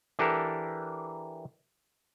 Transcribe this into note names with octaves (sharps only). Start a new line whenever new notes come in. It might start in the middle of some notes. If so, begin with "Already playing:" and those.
E3 D4 G4 A4 A#4